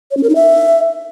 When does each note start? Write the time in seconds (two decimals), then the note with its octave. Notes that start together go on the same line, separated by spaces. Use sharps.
0.11 C#5
0.17 C#4
0.23 A#4
0.29 D#4
0.35 E5